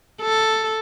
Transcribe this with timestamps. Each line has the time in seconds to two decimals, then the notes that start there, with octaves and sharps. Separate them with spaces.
0.22 A4